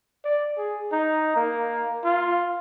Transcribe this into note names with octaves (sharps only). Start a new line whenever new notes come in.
D5
G#4
D#4
A#3
F4